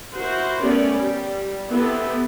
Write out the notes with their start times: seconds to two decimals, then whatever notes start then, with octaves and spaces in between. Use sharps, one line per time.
0.14 E4 F#4 A#4 C5
0.62 A3 B3 C#4 G4 A#4 D5
0.94 G3
1.70 B3 C4 E4 G4 A4